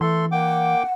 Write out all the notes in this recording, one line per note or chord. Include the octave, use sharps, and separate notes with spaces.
E3 A3 A4 C6
A#3 F#5 G5 D6